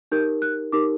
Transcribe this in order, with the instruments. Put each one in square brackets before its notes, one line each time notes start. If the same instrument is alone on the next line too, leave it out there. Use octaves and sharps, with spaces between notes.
[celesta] D#4 G4 A#4 G6
F#6
D#4 G4 A#4 D6